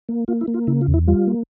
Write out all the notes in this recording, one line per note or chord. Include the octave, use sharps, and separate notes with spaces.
A#3
A#3 F4
E4
A#3
F4
C#3 E4
F4
E2
E4
G3 F4
A#3